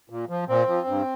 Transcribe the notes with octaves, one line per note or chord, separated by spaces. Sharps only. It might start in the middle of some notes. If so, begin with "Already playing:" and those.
A#2
F3
A#2 C4
F3
G2